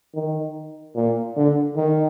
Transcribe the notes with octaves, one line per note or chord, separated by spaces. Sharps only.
D#3
A#2
D3
D#3